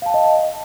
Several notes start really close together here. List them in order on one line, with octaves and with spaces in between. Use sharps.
F5 A5 G5 D#5